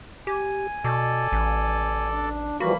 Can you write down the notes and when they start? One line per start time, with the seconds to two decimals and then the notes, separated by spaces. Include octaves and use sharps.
0.27 G4 G#5
0.84 B2 A4 D5
1.32 A1
2.11 D4
2.60 E3 F3 G3 A#3 F#4 B5